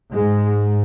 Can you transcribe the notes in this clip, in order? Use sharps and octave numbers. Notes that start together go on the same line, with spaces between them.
G#2 G#3